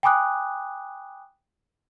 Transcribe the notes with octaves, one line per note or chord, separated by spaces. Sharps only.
G5 G#5 B5 D6 D#6 F#6